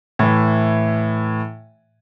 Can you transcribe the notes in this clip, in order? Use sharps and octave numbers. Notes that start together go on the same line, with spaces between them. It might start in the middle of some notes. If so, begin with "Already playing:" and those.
A2 E3